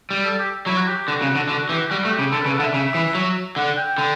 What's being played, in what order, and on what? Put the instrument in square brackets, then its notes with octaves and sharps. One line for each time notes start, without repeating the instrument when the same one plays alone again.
[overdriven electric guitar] G3
[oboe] A4
G4
[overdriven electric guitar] F#3 [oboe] E4
[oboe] F#4
G4
G4
[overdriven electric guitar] D3 [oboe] F#4
[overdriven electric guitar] C#3
[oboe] F#4
[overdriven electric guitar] D3
[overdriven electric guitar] D3 [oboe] F#4
[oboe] F#4
[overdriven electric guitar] E3 [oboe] G4
[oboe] F#4
G4
[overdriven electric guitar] G3 [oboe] F#4
[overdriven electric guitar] A3 [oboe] F#4
[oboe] G4
[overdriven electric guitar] C#3
[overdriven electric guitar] D3 [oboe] A4
[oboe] B4
[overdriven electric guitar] C#3
[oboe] A4
[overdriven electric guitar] D3 [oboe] F#5
[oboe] E5
[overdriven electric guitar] C#3
E3
F#3
[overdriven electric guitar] D3 [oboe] F#5
[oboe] G5
[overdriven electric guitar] D3